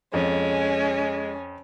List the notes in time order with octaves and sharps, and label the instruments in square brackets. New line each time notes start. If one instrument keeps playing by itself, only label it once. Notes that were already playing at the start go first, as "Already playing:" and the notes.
[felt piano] F2 [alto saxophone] G#3 [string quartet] C#4